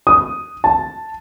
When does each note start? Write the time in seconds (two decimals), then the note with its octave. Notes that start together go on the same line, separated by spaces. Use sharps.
0.07 D#6
0.64 A5